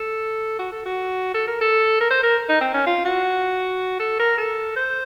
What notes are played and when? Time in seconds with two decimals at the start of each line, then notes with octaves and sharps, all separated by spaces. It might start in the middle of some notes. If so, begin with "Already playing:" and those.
Already playing: A4
0.59 F#4
0.72 A4
0.86 F#4
1.34 A4
1.47 A#4
1.61 A4
2.00 A#4
2.10 C5
2.23 A#4
2.49 D#4
2.61 C4
2.74 C#4
2.86 F4
3.05 F#4
4.00 A4
4.20 A#4
4.38 A4
4.76 C5